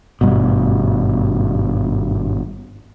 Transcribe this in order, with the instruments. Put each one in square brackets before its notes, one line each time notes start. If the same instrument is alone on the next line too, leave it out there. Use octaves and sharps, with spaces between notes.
[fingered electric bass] G#1 G2 B2